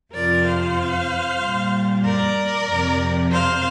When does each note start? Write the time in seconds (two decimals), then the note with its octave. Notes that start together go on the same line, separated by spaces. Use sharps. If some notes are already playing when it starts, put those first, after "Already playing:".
0.13 F2 C3 F3 A#4 D5
0.45 C5 F5
1.41 A#2 G3
2.05 A#4 D5
2.68 F2 C3 F3
3.32 C5 F5